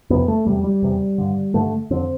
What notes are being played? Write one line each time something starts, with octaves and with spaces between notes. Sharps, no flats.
F2 C3 B3
A3
E2 C3 G3
G3
E2 C3
G2 D3
G2 D3 A3
F2 D3 C4